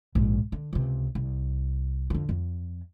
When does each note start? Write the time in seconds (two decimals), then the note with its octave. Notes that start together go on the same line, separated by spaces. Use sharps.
0.15 A#1 G#2
0.52 D3
0.73 C#2 C3
1.15 C2
2.10 F2 D3
2.29 F2